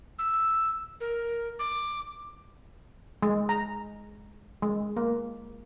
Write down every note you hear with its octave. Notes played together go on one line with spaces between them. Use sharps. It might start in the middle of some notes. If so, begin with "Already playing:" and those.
E6
A#4
D6
G#3
A#5
G#3
A#3